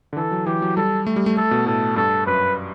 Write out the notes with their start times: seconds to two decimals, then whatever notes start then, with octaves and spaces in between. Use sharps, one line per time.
0.13 D3
0.17 E3 A4
0.32 F#3
0.46 E3 G4
0.62 F#3
0.76 G3 A4
1.07 A3
1.16 G3
1.26 A3
1.37 A3 A4
1.51 B2
1.66 A2 A4
1.96 G2 A4
2.27 F#2 B4